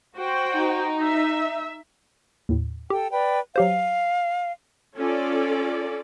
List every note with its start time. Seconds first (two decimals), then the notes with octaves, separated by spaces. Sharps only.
0.15 F#4 C5 G5
0.55 D#4
1.03 E5
2.49 D#2 A2
2.90 G4 A4 G5
3.11 B4 D5 G5
3.56 F#3 G4 C5 F5
4.97 C#4 F4 A4 D5